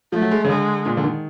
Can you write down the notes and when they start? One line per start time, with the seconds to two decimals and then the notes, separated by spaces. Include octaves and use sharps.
0.12 F3 A3
0.21 F#3
0.31 G#3
0.44 C#3
0.49 D3 G#3
0.86 A#2
0.97 D3
1.04 D#3